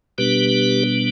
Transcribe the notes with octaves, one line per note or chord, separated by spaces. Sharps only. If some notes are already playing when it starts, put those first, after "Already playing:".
B2 G3 B3 D4 G4 B4